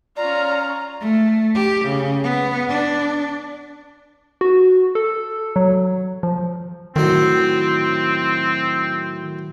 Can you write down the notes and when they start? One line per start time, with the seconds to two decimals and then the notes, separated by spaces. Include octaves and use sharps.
0.17 C#4 F4 D5 A#5
1.01 A3
1.55 G4
1.85 C#3
2.24 B3
2.69 D4
4.41 F#4
4.95 A4
5.56 F#3
6.23 F3
6.96 A2 D#3 F#3 C4